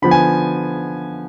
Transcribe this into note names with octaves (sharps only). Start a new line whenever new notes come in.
D3 F3 B3 B5
G#5